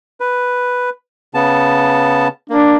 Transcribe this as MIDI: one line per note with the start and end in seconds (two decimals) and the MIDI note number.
0.20 0.90 71
1.34 2.28 49
1.34 2.28 59
1.34 2.28 81
2.50 2.77 58
2.50 2.76 62